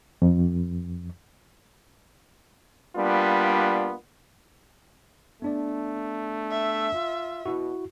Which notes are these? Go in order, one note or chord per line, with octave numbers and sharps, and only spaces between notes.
F2
G3 A#3 B3 D4 F4
A3 B3 D4 D5
E5
F4
B2 E4 F#4